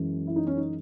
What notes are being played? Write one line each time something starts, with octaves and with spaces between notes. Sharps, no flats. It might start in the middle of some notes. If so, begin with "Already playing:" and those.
Already playing: F#2 E3 G#3
E4
D#4
C#4
D#4